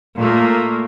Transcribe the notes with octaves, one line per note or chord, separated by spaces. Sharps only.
A#2 A3 A#3